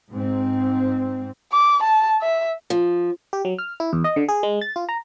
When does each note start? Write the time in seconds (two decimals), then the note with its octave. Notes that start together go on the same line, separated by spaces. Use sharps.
0.11 G#2 C4
1.53 D6
1.83 A5
2.22 E5
2.70 F3
3.33 G4
3.45 F#3
3.58 F6
3.80 E4
3.93 E2
4.04 D#5
4.16 D3
4.29 G#4
4.43 G#3
4.61 A6
4.76 F4
4.89 A#5